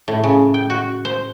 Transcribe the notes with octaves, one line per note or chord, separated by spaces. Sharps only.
A2
C#3
G5
F#4
C5